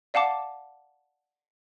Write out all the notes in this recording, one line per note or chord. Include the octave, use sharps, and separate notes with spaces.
D5 F5 F#5 A5 D6